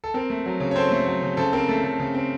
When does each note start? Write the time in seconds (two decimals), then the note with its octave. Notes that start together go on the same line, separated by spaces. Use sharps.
0.04 A4
0.14 C4 A#4
0.30 A3
0.46 F#3
0.60 C#3
0.71 C#5
0.76 C4 A4 C5
0.91 A3
1.07 F#3
1.22 C#3
1.37 C#3 A4 C5
1.53 C4 A#4
1.69 A3 A4
1.83 C#3 A4
2.00 C#3
2.14 C4